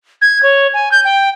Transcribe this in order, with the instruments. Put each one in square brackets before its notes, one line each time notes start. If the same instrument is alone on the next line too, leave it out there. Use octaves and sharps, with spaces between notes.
[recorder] G#6
C#5
G#5
G6
G5